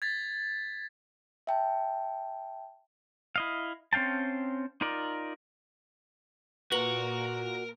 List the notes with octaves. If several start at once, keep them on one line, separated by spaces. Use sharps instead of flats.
G#6 A6 B6
E5 G5 A5
E4 D#5 F5
C4 C#4 F5 G5 A5
D#4 F4 A#4 D5
A#2 F#4 A#4 B4 A#5 F#7